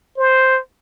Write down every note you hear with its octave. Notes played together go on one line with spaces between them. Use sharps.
C5